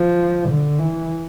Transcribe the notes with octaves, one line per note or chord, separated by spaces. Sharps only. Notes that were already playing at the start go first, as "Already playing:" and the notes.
Already playing: F3
D3
E3